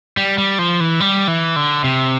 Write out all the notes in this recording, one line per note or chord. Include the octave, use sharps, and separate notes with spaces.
G3
G3
F3
E3
G3
E3
D3
C3